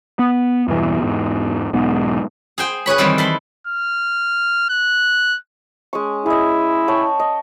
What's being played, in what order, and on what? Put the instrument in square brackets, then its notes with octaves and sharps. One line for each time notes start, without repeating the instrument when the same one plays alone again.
[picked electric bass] B3
E2 G2 B2 E3
E2 G#2
E1 B1 G#2 B3
[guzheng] G#4 C5 G5
G#4 B4 C#5 B5
D#3 E3 G3 C4
A4 B5 C6
[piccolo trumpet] F6
F#6
[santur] G#3 C#4 C#6
[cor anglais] E4 [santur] G#4 D#5
[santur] C#5 G5 A5
D#5